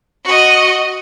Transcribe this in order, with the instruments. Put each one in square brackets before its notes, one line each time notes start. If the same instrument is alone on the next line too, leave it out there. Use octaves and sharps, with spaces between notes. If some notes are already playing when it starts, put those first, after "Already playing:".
[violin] F#4 D#5